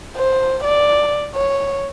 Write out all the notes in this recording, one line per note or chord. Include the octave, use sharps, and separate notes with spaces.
C5
D5
C#5